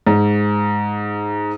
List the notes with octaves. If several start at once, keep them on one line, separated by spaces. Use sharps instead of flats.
G#2